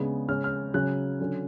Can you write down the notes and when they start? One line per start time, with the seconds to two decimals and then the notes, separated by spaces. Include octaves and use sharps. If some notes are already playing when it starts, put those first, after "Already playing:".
Already playing: C#3 G#3 B3 D4
0.28 C#3 G#3 C#4 F6
0.44 F6
0.74 C#3 F#3 C#4 F#6
1.20 D3 F#3 C#4